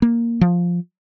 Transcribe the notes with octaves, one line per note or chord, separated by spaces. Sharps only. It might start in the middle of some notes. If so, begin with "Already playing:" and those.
A#3
F3